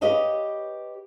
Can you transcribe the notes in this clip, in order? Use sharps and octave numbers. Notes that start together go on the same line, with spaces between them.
G4 B4 C#5 D#5 F5 A5